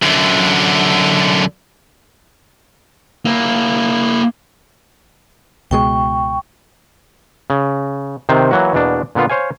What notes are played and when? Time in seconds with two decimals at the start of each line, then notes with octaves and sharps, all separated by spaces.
0.03 F#2 D3
3.25 A#3 E4
5.71 C#2 B2 G#3 G5 C#6
7.50 C#3
8.29 C3 D#3 C5
8.51 E3 F#3 A#3 F#4
8.73 E2 B2 A#3 D4
9.15 A#2 D3 B3 F4
9.30 C5 C#5 F5 G#5